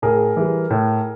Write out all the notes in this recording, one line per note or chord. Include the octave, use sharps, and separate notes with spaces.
A2 G#4 A#4
E3 G3
A2